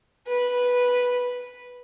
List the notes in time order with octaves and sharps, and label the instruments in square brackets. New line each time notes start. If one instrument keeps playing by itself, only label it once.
[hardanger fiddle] B4